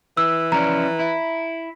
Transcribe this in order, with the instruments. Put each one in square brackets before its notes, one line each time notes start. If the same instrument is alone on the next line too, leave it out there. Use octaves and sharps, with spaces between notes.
[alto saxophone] E3 [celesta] E6
[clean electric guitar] F3 C#4 D5 [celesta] A#5
[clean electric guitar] E4